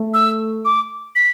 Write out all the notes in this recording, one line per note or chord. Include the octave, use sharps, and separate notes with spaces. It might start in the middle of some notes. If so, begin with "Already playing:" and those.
Already playing: A3
E6
D6
B6